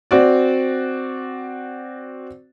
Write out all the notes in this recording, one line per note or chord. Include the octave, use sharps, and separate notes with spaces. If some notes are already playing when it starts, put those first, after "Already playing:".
C4 F#4 D5